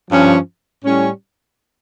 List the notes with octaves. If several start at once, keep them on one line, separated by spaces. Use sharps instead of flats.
G2 F3 C#4
A2 G3 C#4